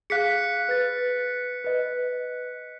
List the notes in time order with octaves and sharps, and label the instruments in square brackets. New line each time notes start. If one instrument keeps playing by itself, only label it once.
[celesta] G#4 F5 [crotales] F#6 B6 C#7
[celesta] B4 A6
B4 D#5